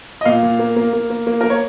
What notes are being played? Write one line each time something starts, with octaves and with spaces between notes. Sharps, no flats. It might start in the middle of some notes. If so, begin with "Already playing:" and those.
D#5
A#2 F5
A#2
A#3
A#3
A#3
A#3
A#3
A#3 A#4
C#5